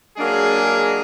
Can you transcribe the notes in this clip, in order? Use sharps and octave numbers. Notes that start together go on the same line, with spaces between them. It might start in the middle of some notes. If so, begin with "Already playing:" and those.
F#3 G#3 A#3 D4 G#4